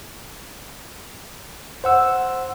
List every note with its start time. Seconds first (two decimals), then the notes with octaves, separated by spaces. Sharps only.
1.84 C5 F#5 E6